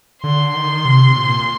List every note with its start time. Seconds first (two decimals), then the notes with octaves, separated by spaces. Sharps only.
0.23 D3 C6
0.55 D#3
0.85 C3
1.16 A#2
1.40 A#2